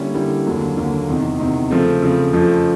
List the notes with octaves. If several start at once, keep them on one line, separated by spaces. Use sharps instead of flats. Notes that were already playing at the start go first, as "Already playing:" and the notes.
Already playing: D3 G3 A#3 C#4 E4
D3 G3 A#3 C#4 E4
D#2 D3 F#3 A#3
D#2 D3 F#3 A#3
E2 C3 D#3
E2 C3 D#3
C#3 F3 A3 C4
C#3 F3 A3 C4
F2 C#3 F3 A3